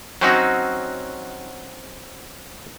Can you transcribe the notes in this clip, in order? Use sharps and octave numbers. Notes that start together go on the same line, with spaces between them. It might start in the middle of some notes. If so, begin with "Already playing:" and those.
F#3 C4 C#4 D#4 F#4